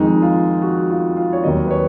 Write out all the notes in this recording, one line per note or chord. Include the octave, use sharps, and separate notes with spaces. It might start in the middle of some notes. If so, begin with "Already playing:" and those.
Already playing: F2 D#3 G#3 D#4
F4
F#4
F4
F4
C#5
D#2 D#3 F#3 D#5
B4
C#5